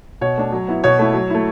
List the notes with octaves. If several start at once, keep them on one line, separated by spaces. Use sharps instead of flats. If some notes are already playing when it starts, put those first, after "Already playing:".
B2 C#5
A3 D4
F#3
B3 E4
B2 C#5
A3 E4
F#3
A3 E4